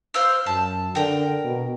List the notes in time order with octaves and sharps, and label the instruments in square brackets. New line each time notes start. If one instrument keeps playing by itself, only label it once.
[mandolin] C5 F5 E6
[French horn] F#2 [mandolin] A5
[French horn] D3 [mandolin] A#4 G5
[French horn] B2